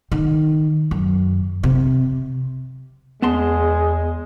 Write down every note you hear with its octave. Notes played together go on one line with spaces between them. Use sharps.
D#3
F#2
C3
E2 G#3 B3 A5 C6